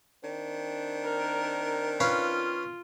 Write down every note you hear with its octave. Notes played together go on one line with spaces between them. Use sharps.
D#3 C4 D4
A#4
C#4 F4 B4 F5